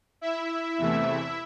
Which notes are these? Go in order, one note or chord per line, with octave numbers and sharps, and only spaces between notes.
E4 E5
E2 C3 E3 A3